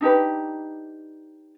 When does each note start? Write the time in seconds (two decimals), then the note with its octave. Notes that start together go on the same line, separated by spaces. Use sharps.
0.01 D4 D#4 G4 B4